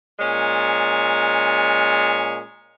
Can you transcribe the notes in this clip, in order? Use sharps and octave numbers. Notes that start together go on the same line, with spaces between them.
A#2 G#3 C#4